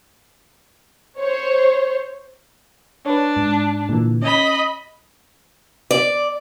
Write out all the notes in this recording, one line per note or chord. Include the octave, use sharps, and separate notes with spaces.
C5 C#5
D4 B4 C#5
G#2
A#2 D3 E3
C#4 D#5 B5
D5